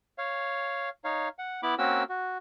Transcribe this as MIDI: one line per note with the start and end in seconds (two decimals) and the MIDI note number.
0.18 0.89 73
0.18 0.89 77
1.04 1.28 63
1.04 1.28 73
1.04 1.28 77
1.39 1.61 78
1.63 1.75 59
1.63 1.75 64
1.63 1.75 83
1.63 1.75 86
1.78 2.03 58
1.78 2.03 60
1.78 2.03 61
1.78 2.03 66
1.78 2.03 70
1.78 2.03 88
2.09 2.38 66